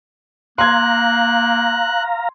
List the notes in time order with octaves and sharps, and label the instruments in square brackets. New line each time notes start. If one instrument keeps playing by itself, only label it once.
[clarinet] A#3 [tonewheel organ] F5 A#5 [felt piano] C6 G#6 [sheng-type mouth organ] F#6